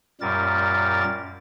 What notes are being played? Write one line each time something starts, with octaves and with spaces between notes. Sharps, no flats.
F#2 A#2 G3 A#4 A6